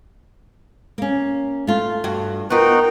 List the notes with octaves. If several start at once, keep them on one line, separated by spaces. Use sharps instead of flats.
A#3 C#4
A3 F4
G2 F#4
B3 D#4 F4 F#4 A#4 G5